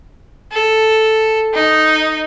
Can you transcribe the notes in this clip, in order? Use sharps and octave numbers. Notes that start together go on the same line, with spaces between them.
A4
D#4